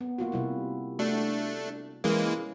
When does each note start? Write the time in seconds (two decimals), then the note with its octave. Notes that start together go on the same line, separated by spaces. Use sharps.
0.01 B3
0.18 A#3 F4 F#4
0.32 C3 G3 E4
0.99 A3 D4 F#4
2.04 E3 G#3 A#3 C#4 E4